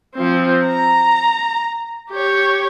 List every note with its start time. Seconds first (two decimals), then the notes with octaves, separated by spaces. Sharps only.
0.16 F3 C4
0.66 A#5
2.11 G4 C#5